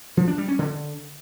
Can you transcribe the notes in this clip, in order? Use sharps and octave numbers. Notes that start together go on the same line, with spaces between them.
F3
D4
G3
C#4
D3